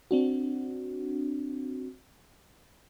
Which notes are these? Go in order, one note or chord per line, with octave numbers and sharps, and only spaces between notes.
C4 D4 F#4